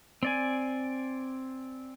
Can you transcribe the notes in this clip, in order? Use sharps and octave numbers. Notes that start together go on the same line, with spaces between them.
C4 D5 G#5